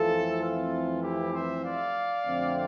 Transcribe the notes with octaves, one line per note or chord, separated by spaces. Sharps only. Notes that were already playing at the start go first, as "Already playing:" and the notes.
Already playing: F2 E3 A3 C4 F4 A4
F4
E4 G4
C5 E5
D5 F5
F2 D3 A3 C4